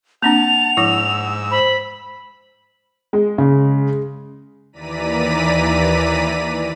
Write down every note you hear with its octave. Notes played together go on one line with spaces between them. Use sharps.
A#3 C4 D4 F#5 A5 F7
G#2 F3 E4 E6
C5 B5
G#3
C#3
D#2 E3 D5 A#5 B6 D#7